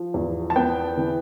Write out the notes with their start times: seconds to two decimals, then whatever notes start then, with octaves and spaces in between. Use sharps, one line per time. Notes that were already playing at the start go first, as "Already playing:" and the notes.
Already playing: F3
0.14 E2
0.50 A5
0.56 B3 G5
0.97 E3